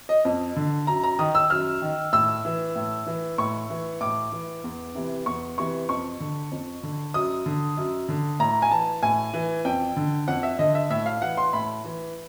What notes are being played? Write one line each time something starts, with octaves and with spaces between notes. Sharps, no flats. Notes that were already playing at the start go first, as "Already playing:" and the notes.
D#5
F2
D3
F#2 A#5
A#5
D#3 D#6
E6
F#2 F6
D#3
A2 E6
E3
A2
E3
A2 C#6
E3
A2 D6
E3
E2
C3 E3
E2 C#6
C3 E3 C#6
F2 C#6
D3
F2
D3
F#2 D#6
D3
F#2
D3
A2 A#5
G#5
E3 A5
A2 G#5
E3
F2 G5
D3
F2 F#5
E5
D3 D#5
E5
A2 E5
F5
E3 F#5
C6
A2 B5
E3